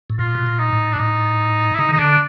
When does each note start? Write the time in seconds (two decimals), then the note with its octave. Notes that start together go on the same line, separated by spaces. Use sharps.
0.10 A2
0.19 A#2 F4
0.35 B2
0.46 A#2
0.59 D#4
0.72 A2
0.93 D4
0.99 A2 D#4
1.74 E4
1.79 C#3 D#4
1.89 D#3 D#4
1.99 D3 D4